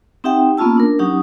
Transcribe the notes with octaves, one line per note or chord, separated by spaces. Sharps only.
C4 D#4 G4 E5 F#5 G5
A#3 B3 C#4 F4 A5 E6
D4 A#4
F#3 C#4 D#4 G4 F#5 D#6